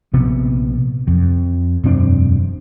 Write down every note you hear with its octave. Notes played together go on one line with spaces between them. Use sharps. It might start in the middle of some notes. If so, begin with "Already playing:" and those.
A#1 C3 B3
F2
E1 F#2 C4 D4